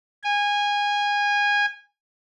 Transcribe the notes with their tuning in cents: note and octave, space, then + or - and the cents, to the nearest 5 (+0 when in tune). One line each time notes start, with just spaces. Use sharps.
G#5 -20